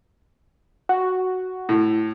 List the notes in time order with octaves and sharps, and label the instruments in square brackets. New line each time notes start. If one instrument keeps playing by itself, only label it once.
[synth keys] F#4
[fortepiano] A2